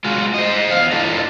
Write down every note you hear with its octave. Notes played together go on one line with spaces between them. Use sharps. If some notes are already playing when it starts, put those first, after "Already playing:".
G#3 F4 F#4
C5 D#5
E2 F5
D4 E4 F4 A4 D5 D#5